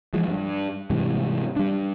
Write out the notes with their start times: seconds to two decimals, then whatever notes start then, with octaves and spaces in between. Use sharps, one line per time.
0.13 E3 F3 G#3
0.28 G2
0.90 G#2 C3 E3 G3
1.56 G3 D4